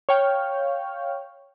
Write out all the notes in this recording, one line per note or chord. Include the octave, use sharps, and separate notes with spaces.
C#5 F5 G5 F6